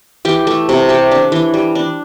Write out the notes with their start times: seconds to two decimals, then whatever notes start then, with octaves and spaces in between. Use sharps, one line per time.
0.25 E3 G4
0.47 A3
0.69 C3
0.89 A3 G4
1.11 D4
1.32 E3
1.54 G3
1.75 D4